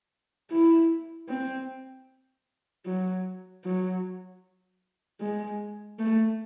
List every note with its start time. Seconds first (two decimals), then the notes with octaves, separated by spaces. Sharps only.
0.51 E4
1.29 C4
2.86 F#3
3.65 F#3
5.20 G#3
5.99 A3